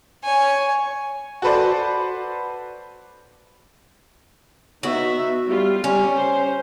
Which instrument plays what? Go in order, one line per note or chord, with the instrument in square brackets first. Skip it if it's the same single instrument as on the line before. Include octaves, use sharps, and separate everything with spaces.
[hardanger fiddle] C#5 G#5
[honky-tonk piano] F#4 A4 B4 C5 D5
[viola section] B3 D#4 E5 [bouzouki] F#4
[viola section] G3 F4
[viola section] G3 [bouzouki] C#4
[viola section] C5